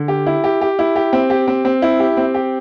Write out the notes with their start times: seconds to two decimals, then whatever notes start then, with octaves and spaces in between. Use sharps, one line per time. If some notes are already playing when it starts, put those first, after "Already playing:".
Already playing: D3
0.08 G4
0.27 E4
0.44 G4
0.61 G4
0.79 E4
0.96 G4
1.13 C4
1.30 G4
1.48 C4
1.65 C4
1.82 E4
2.00 G4
2.17 C4
2.35 G4